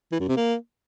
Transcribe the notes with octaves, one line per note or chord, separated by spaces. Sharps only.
E3
F#2
C3
A#3